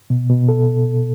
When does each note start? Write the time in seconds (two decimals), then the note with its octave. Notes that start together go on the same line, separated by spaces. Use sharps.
0.10 B2
0.30 B2
0.49 A4